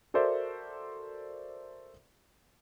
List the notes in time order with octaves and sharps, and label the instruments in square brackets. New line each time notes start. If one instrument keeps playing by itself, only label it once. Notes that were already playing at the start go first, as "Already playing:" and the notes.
[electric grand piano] F#4 A4 A#4 C5 D5 E5